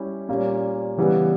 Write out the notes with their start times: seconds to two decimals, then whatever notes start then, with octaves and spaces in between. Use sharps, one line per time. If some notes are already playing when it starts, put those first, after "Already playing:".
Already playing: G3 C#4 E4 G4
0.29 A#2 G3 A#3 C#4
0.98 C#3 E3 G3 B3